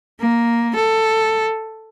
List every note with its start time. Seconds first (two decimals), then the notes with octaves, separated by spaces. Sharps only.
0.20 A#3
0.75 A4